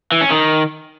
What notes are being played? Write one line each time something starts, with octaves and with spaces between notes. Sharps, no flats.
E3
C#4
D#3